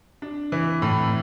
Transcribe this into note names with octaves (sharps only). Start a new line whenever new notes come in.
D4
E3
A2